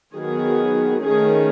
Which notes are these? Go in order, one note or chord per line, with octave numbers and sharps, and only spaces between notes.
D#3 F#3 B3 G#4
D#3 A3 C#4 G#4